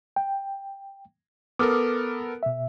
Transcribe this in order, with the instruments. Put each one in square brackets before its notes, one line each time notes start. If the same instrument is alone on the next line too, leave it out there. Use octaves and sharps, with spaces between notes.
[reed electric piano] G5
[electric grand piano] B3 A4 A#4 [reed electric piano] D6 D#6 F6
[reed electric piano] B2 E5